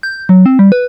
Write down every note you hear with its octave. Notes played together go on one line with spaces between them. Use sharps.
G6
F#3
C4
G3
B4